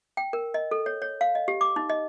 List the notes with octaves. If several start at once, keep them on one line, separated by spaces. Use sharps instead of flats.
G5
A#4
D#5
A4
C#5
C#5
F5
D#5
G4
D6
D#4
D#5